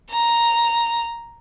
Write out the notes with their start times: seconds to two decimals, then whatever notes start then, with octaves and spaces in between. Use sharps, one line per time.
0.11 A#5